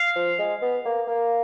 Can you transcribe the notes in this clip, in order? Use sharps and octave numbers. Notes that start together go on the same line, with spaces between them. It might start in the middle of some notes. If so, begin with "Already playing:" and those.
Already playing: F5
F3
G#3
B3
A#3
A#3